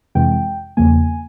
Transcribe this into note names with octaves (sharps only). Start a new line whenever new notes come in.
F2 C3 E3 G#3 G5
E2 C#3 F3 A#3 G#5